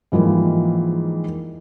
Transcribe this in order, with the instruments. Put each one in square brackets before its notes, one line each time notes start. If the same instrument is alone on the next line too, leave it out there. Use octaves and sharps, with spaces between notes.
[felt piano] G#2 E3 F3 G3 A#3